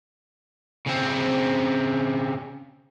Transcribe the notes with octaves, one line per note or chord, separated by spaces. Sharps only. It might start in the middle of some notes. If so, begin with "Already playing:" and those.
C#3 C4